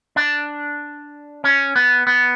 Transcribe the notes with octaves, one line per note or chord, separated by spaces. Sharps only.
D4
C#4
B3
B3